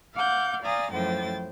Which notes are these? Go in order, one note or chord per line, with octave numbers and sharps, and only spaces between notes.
F5 F#5 D6 G6
D5 F5 G#5 A#5 D#6 A6
F#2 A2 F3 C5 G5 A6